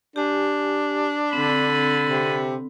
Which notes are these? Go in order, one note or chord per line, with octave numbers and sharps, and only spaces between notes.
D4 G4 G#5
D3 C4 B5
C3